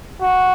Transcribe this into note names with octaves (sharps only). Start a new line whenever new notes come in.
F#4